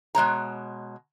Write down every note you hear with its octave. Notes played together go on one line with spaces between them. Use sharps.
B2 G#3 C#5 A#5